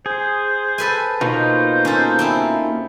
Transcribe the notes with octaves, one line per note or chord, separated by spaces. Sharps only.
G#4 C5
A4 B4 G#5
B2 A#3 D#4 F4 C5
C#4 A4
C4 C#4 E4